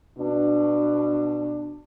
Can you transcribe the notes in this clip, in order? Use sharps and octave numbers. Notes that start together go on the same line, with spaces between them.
B2 D4